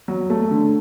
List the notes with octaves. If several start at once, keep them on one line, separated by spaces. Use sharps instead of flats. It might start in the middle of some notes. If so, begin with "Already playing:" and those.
F#3
A3
D3